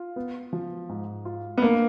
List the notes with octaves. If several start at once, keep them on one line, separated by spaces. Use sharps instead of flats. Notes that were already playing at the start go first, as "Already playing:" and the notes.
Already playing: F4
B3
F3
G#2
F4
B3
A#3 D4